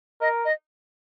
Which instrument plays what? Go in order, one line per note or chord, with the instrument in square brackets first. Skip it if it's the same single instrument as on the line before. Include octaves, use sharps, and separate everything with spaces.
[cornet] A#4 [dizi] D#5
[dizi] D#5